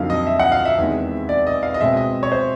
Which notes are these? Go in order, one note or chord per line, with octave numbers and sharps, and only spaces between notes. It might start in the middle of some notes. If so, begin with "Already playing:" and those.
Already playing: F2 D3 F#3 A#3 D#4 F5
D#5
E5
F#5
F5
E5
E2 C3 D#3 G#3
D5
D#5
F5
D#5
B2 G#3 C4 E5
D#5
C#5
C5